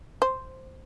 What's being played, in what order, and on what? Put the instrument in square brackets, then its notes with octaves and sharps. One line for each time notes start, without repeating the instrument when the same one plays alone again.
[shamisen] C5